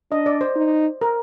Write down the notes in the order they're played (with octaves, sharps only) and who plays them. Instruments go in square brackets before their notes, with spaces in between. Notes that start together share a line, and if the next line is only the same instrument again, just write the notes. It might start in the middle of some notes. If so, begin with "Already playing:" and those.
[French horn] D4 [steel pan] D#5
[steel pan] D5
C5
[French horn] D#4
[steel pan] A#4